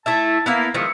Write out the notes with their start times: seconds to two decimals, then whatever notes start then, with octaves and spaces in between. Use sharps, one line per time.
0.06 A3 E4 E5 A5
0.46 A#3 B3 E4 F5
0.74 D#3 F3 G#3 B4 E5 C#6